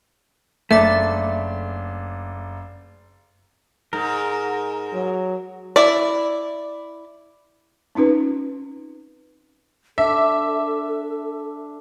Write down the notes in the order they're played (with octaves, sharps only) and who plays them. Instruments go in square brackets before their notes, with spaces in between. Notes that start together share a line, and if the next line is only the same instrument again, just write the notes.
[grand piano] F#1 D4 [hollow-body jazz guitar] A3 [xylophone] E5 D6 A6
[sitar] G#2 [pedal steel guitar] A#4
[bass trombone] F#3
[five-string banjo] E4 D5
[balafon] C4 C#4 D#4 F4 B4
[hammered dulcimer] D4 [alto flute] A4 [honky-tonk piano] E5